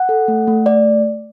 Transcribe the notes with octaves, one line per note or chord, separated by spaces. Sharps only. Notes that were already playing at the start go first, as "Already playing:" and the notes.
Already playing: F#5
A4
A3
A3
A3 D5